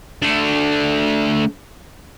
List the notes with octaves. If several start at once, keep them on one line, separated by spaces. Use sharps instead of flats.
A3 D4